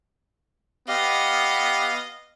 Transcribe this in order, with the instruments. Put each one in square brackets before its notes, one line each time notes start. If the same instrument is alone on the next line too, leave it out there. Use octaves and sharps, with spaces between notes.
[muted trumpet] B3 [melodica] G4 [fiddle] D#5 [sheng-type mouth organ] F5